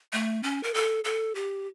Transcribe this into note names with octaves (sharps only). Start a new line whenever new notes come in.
A3
C#4
A#4
A4
A4
G4